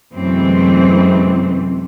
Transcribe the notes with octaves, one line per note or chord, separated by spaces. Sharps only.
F#2 C3 E3 G#3 A3 C4